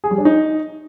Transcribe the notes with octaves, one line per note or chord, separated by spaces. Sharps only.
G#4
G3
D4
D#4